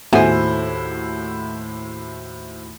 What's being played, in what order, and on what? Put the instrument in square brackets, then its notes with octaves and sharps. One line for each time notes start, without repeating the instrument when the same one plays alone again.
[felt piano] D#2 A2 F#4 [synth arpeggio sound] A3 B3 G#5 [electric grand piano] E4 C5